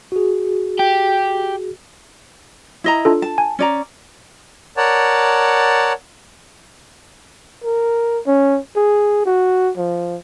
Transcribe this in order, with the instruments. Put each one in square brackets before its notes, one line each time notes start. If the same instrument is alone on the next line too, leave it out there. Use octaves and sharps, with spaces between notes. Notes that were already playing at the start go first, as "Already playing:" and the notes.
[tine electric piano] F#4 G#4
[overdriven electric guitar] G4
[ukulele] E4 D#5 A#5
[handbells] D4 F4 A4
[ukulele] A5
[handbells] G#5
[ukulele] C#4 D5 A#5
[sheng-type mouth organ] A#4 C#5 D5 F#5 A5
[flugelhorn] A#4
C#4
G#4
F#4
F3